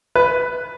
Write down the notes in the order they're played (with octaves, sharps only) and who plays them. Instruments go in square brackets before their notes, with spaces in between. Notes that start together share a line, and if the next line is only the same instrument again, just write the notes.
[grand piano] B4